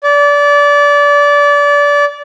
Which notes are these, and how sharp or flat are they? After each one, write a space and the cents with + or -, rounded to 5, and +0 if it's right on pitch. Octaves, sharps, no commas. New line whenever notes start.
D5 -25